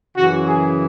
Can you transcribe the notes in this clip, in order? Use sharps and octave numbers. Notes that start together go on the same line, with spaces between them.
F#2 C#3 E3 F#4
G#4